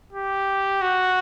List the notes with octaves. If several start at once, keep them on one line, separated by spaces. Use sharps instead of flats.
G4
F#4